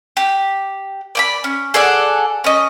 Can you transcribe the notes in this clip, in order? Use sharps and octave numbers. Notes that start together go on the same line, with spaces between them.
G4
D5 G5 B5
C#4
G#4 A4 D5 F#5
C#4 D#5